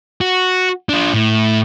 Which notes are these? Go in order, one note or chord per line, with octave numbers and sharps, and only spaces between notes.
F#4
D4 F4
A2